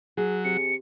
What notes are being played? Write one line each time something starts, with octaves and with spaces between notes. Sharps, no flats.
F#3 G#4
C3 C#7